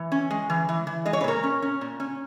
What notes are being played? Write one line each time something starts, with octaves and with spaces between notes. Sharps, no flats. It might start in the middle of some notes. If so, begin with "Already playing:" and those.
Already playing: E3
C#4
G#3
E3
E3
E3
G#3 D#5
C#5
B4
A#2 A#4 C#5
C#4
C#4
A#2
C#4